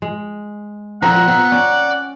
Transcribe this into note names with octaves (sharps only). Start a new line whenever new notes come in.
G#3
A#2 F3 C4 F#5 A#5
B3 C4
C#4 D5